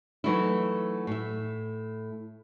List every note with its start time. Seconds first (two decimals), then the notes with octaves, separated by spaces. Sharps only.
0.24 E3 F#3 A3 D#4 E4
1.07 A2 E5